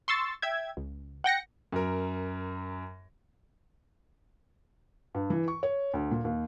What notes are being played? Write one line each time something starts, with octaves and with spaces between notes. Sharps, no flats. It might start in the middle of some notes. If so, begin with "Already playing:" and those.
C6 C#6 E6 A6
E5 G5 G#6
C#2
F#5 G5 A#6 C#7
F#2 A#4
G2
E3
C#6
C#5
D2
A#2
D#2